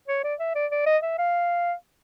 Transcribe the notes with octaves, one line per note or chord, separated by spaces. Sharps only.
C#5
D5
E5
D5
D5
D#5
E5
F5